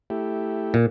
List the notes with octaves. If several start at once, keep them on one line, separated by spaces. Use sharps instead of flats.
A3 E4 G4
A#2